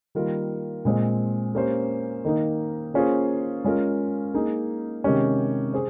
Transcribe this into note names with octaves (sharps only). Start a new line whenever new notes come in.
D#3 G3 A#3 F4 A#4
A#2 G#3 C4
A#3 C#4 G4 C5
D#3 A#3 D#4
A#3 C#4 F4 G#4 C5
G#3 C#4 F4 A#4
A#3 D#4 G#4
C3 D#3 G#3 C#4 G4
G#4 C5